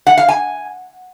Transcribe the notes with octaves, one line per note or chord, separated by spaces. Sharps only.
F#5
F5
G#5